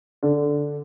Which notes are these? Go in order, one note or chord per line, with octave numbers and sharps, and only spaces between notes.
D3 D4